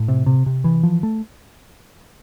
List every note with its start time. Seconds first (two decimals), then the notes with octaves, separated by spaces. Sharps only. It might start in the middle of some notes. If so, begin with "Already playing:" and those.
Already playing: A2
0.08 C3
0.26 C3
0.46 C3
0.64 E3
0.83 F3
1.03 A3